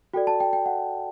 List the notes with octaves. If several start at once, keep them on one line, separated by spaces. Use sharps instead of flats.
F#4 A4 D5 G5
A5
G5
G5
F#5